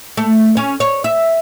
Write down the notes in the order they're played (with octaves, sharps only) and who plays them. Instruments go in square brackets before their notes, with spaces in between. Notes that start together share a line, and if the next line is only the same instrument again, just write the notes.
[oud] A3
C#4
C#5
E5